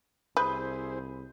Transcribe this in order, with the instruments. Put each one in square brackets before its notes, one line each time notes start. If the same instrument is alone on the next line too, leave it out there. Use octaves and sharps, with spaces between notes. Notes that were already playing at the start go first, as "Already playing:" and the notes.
[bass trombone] C2 [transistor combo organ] E4 G#4 C5 [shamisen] B4 [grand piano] B5 D#6 G6